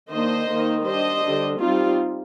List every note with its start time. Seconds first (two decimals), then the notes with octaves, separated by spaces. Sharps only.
0.12 D#3 A#3 D4 C5 D#5
0.50 D#3 A#3 D#4
0.86 G3 D4 C5 D#5
1.24 D3 G3 D4
1.61 G3 C4 D#4 F4